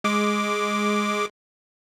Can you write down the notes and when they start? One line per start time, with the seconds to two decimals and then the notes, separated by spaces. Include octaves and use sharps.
0.04 G#3 D6